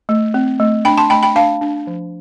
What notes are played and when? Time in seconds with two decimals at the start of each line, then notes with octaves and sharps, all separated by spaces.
0.09 A3
0.34 C4
0.60 A3
0.85 D4 G5 B5
0.97 A5 C6
1.10 A3 G5 B5
1.23 G5 B5
1.35 D4 F5 A5
1.61 D4
1.87 F3